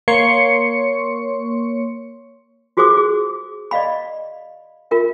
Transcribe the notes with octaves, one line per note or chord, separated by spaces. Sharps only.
A#3 C#5 C6 C#6 C#7
F4 F#4 G#4 C5 D6 D#6
G#4
D5 D#5 F5 B5
F4 A#4 E5